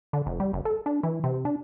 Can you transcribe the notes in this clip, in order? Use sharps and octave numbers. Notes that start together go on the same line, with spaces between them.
D3
F1
G3
F#1
A4
D4
E3
C3
D4